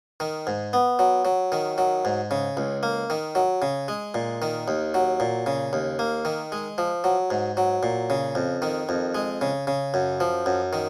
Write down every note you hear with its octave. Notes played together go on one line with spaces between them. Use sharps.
D#3
G#2
B3
F#3
F#3
D#3
F#3
G#2
C#3
C#2
A#3
D#3
F#3
C#3
G#3
A#2
D#3
D#2
F#3
A#2
C#3
D#2
A#3
D#3
G#3
F3
F#3
G#2
F#3
A#2
C#3
F2
D#3
F2
G#3
C#3
C#3
F#2
F3
F#2
D#3